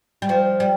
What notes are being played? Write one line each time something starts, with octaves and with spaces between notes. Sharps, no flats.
G3
F3
G3